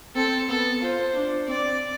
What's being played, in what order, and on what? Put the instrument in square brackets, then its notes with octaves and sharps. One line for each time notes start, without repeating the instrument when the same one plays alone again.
[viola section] C4 [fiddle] A4
[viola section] B3 [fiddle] A4
[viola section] F4 [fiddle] C5
[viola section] D4
[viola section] C4 [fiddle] D5